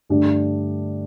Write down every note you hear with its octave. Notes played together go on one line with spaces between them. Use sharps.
G2 D3 A3 D4 G4